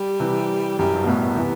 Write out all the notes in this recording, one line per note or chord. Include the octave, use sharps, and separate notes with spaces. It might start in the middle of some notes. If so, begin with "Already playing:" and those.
Already playing: G3
C3 E3
F#2 G3
G2
B2
F#2 A2 B3
C3 E3